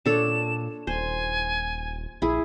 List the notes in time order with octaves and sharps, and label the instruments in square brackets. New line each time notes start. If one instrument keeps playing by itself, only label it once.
[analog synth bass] A#2 [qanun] D4 A4 C#5 [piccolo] E7
[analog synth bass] D#1 [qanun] C5 [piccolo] G#5
[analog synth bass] A#1 [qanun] E4 G#4